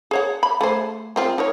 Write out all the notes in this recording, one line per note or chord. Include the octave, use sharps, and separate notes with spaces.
G#4 C#5 F#5
B5
A3 G#4 C5
G#3 C4 F4
D#4 A#4 C#5